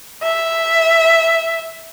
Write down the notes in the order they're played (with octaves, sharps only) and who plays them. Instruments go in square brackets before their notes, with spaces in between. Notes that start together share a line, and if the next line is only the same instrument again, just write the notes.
[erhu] E5